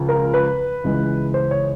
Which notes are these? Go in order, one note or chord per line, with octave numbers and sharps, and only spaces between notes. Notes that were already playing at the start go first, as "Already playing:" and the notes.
Already playing: C#2 C#3 F3
A#4
B4
C#2 C#3 E3 G#3
C5
C#5